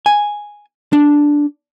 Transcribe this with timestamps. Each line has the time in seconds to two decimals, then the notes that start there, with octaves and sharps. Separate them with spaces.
0.06 G#5
0.93 D4